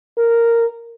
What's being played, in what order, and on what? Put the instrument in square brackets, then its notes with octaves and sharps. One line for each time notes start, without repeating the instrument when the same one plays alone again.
[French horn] A#4